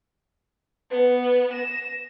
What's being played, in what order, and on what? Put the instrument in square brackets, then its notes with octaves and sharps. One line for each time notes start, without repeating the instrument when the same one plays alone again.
[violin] B3 [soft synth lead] B4
[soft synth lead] A#6 [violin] E7